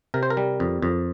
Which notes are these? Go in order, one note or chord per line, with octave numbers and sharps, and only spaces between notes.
C3 A#4
C5
A#4
G3
F2
F2